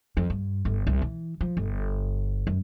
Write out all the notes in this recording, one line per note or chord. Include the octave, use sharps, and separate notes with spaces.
F2
G2
G1
C2
E3
F3
G1
F#2